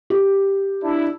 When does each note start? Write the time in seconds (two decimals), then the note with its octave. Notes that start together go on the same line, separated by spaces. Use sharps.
0.10 G4
0.83 D4 E4